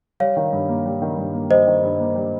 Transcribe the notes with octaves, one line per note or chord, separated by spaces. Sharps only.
G3 C#5 F5
D#3
G2
A#3
G3
D#3
G2
A#3
G3 C5 D#5
D#3
G2
A#3
G3